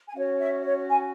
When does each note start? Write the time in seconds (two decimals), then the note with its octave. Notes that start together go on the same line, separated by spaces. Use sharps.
0.06 G#5
0.14 C#4 F#4 C#5 F#5
0.38 E5
0.64 C#5
0.89 G#5